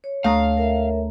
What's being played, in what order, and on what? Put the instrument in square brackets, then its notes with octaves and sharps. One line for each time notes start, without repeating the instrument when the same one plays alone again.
[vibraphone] C#5
[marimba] D2 D#6 [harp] A3 A#5 [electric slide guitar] F5
[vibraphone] A#4 C#5 E5